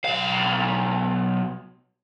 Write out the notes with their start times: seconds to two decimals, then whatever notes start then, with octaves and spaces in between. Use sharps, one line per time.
0.05 B1 F5